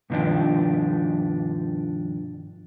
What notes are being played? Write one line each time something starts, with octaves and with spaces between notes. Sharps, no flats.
G2 B2 D#3 F3 D4